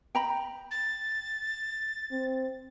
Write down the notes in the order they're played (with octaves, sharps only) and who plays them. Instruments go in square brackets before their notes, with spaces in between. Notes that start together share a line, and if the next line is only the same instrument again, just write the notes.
[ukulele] G5 A#5 B5
[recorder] A6
[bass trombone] C4